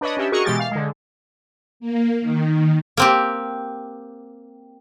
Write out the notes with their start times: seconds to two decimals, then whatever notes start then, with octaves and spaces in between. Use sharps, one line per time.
0.01 D4 B4 C#5 D#5
0.17 C#4 D4 G4 E5
0.32 F#4 G#4 A#4 D#5 C#6
0.45 B2 E3 G#3 G4 A6
0.59 F5
0.71 D3 G#3
1.80 A#3
2.21 D#3
2.97 A#3 C4 G4